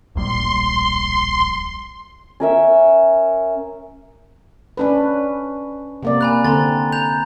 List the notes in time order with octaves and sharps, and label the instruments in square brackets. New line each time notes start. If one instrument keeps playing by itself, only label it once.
[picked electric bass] D1 A#1 G3 [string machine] C6
[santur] C#4 A#4 E5
[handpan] C#4 D4 B4
C3 A#3 D5
[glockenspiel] G#5 B5 F#6
[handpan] D3 C4 [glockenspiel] A#5 C6 A6
[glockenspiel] A#5 G6 F7